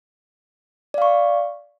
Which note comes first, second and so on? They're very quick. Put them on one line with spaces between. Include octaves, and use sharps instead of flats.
D5 F5 C#6